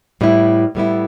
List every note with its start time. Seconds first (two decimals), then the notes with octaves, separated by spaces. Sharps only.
0.21 A2 G3 B3 E4
0.75 A2 G3 B3 E4